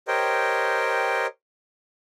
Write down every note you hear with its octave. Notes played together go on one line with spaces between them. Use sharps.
G4 A#4 C5 C#5 D#5 G5